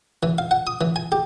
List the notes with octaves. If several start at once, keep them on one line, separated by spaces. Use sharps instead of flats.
E3
F5
F#5
D#6
E3
G#5
G4